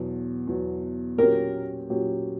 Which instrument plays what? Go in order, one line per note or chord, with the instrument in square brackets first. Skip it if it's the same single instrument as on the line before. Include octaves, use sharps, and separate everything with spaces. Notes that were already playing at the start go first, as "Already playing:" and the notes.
Already playing: [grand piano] E2 B2 F#3
E2 B2 F#3
[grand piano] A#2 F#3 C#4 G4 [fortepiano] A#4
[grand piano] A#2 F#3 C#4 G4